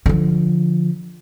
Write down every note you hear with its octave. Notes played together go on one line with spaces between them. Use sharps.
D3 F3